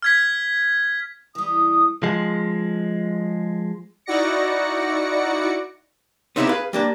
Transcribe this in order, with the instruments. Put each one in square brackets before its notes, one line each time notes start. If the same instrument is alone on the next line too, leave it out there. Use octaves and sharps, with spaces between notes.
[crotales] F6 G#6 B6
[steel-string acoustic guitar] E3 G3 [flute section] D#6
[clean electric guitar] F3 G#3
[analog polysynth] D#4 E4 F#4 D5 A#6 C#7
[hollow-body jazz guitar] B3 C4 D#4 E4 F#4 G4
G#4 B4 F5
G3 A#3 D4